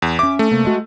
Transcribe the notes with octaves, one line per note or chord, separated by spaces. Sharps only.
E2
C#4 E5 D6
A3
C3 A#3
G#3 F#4